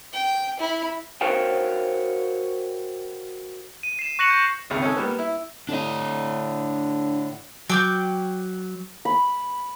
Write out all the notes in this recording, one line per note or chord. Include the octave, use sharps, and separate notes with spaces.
G5
E4
F#4 A#4 C5 C#5 F5 G5
D#7
C7 E7
C#6 F#6 A#6 C#7 E7 F#7
G6 A#6
G#1 C#2 C3
C#4 D#4 A4 G#5
G3 A#3 B3
E4
A2 D3 D4 D#5
F#3 G5 D6 G6
B5